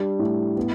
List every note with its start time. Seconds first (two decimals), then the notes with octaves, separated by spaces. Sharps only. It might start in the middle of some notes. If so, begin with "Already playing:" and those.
Already playing: G3 D4
0.19 A2
0.57 B3